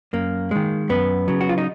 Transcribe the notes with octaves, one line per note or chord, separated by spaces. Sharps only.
F#2 A#3
D#3 G#3
F#2 B3
C#3 F#3
F#4
F4
D#4